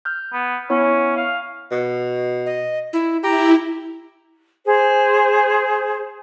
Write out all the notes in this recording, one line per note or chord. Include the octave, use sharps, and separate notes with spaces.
F6 G6
B3
B3 C#4 E4 C#5
F5
B2
D#5
E4
E4 G4 A#5
G#4 C5